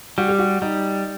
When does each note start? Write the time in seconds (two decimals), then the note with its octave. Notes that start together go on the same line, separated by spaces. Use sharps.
0.18 G3 F#4
0.28 G4
0.39 F#4
0.62 G3 D#4